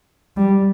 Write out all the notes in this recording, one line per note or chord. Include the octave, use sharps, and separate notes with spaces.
G3